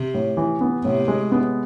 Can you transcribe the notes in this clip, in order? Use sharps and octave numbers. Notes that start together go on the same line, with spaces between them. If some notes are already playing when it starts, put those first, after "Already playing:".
Already playing: C3
A2
E3
B3
A2 C3
G#3
B3